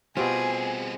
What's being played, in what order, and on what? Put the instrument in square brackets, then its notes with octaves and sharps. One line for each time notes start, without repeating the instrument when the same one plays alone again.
[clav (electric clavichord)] B2 F4 [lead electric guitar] G3 G#4 [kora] C4 G4 [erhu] G#5